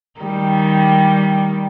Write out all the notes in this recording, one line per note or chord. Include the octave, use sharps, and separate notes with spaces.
D#3 G3